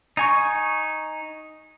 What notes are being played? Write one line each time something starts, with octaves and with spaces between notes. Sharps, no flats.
D#4 G#5 C#6